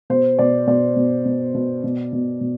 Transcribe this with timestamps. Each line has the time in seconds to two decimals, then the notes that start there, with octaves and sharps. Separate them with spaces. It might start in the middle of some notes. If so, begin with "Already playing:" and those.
0.10 B2 C5
0.39 B2 D5
0.67 B2 D5
0.96 B2
1.25 B2
1.54 B2
1.84 B2
2.13 B2
2.41 B2